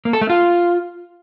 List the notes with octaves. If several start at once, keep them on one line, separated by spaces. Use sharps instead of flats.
A#3
A4
A3
F4